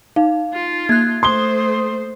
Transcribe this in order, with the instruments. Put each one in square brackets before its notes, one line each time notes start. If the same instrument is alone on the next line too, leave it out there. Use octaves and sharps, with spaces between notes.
[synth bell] D#4 [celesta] F5
[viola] F4
[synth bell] A#3 F#6 [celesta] G#6
[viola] A3 C5 [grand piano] C6 G7 [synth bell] D#6